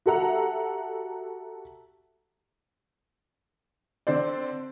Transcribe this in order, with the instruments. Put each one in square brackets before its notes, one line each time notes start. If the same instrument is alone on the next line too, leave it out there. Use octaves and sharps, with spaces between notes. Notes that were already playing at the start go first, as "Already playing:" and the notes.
[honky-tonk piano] F#4 G4 A4 E5 F#5 A#5
[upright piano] D3 C4 C5 D5